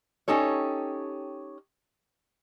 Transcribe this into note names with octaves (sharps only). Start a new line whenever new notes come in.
C#4 D#4 G4 A4 C#5